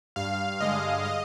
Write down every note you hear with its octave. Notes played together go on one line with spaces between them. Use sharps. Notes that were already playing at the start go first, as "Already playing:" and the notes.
G2 F5
D3 G#3 D#5
D#5